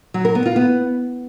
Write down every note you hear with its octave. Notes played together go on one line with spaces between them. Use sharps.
F#3
A#4
B3
F4
B3